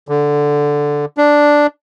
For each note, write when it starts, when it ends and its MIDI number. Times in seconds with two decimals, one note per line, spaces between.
0.08 1.05 50
1.17 1.67 62